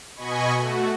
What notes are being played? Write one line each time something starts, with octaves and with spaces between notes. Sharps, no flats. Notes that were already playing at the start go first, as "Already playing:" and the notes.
B2 D#5 G#5 B5 C#6
A3 F#4